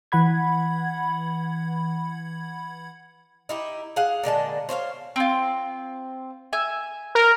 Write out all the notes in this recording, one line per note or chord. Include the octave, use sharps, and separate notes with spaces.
E3 F#5 B5 G#6
D#4 E4 G4
G#4 F5 F#5
A#2 D3 G#3 A5
C5 C#5 E5 F5
C4 F4
E5 G#5
A#4